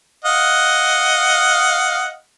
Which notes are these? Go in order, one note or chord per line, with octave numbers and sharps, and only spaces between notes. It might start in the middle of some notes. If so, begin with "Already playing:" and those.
D#5 F5 F#5